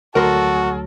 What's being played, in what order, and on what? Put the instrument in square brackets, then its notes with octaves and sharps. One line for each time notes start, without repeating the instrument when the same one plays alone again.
[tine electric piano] D2 F#3 A#6 [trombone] F#4 [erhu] A4 [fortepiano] A#4 C6 C#6